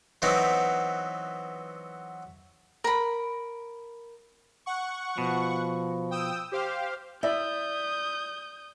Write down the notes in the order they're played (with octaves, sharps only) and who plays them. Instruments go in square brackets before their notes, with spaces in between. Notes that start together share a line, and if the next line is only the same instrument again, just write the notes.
[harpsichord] E3 F#3 B3 C4 D#4
[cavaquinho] A#4 B5
[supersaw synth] F#5 C#6
[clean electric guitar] B2 [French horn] F3
[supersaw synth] G5 D#6 E6
G4 C5 F5
[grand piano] E4 E5 [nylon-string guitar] D5 [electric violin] D#6 G6